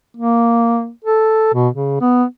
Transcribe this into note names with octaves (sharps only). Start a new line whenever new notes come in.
A#3
A4
B2
C#3
B3